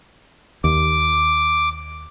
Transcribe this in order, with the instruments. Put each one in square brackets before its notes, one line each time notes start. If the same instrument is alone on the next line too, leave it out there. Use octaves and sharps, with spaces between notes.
[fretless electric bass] D#2 [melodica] D6